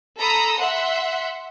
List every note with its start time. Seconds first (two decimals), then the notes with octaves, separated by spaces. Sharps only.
0.18 A4 A#5 B5 D#6 E6
0.56 E5 F#5 C6